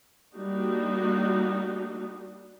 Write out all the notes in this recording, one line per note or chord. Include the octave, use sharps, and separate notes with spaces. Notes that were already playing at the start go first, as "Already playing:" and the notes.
G3 A#3 D4 D#4 F#4